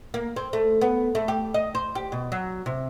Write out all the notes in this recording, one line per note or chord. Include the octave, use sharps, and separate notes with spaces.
A#3
C4
A3
B3
A3
G4
D#5
C5
G4
B2
F#3
C3